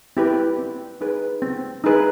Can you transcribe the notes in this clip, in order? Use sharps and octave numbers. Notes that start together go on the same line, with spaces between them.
C4 E4 G4 B4
C4
D#4 G#4 B4
C4
D#4 G#4 B4